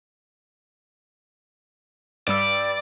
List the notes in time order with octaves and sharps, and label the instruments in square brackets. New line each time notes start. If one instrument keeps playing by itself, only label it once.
[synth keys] G2 G3 E6 [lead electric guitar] D5